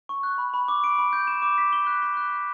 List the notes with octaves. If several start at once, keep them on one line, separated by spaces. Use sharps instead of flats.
C#6
F#6
B5
B5
D6
D7
B5
G6
E7
D6
B6
G7
F#6
B6
F#6
F#6